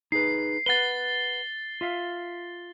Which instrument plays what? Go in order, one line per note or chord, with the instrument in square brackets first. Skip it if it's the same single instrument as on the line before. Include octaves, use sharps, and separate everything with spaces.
[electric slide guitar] D#4 G#4 B4 [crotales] C7
[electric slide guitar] B4 F#5 [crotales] A6 C7 G7
[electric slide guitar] F4 E5 F5